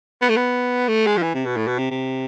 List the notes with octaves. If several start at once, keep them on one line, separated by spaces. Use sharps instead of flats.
B3
A3
B3
A3
G#3
F3
E3
C3
B2
A2
B2
C3
C3